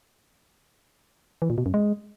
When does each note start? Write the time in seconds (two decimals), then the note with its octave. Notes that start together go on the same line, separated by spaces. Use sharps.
1.42 E3
1.50 A#2
1.58 B2
1.66 F#2
1.74 G#3